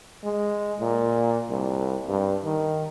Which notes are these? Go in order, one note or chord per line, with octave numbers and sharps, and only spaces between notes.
G#3
A#2
C2
G2
D#3